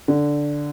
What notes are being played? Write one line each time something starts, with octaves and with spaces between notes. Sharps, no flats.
D3